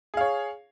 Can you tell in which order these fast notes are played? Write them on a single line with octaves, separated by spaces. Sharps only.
G#4 F5 C#5